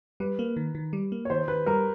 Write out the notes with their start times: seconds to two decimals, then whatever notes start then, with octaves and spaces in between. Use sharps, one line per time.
0.20 G3 B4
0.39 A#3
0.57 D#3
0.75 D#3
0.93 G3
1.12 A#3
1.25 C#5
1.30 D#3 C5
1.48 D#3 B4
1.66 G3 A#4